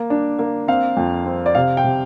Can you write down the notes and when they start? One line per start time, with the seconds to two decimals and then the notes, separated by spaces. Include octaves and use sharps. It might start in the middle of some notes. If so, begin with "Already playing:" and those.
Already playing: A#3
0.10 D4
0.39 A#3
0.68 C4 F5
0.97 F2
1.26 C4
1.46 D5
1.55 C3 F5
1.77 G5
1.84 C3